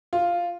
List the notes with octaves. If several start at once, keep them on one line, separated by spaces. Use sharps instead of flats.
F4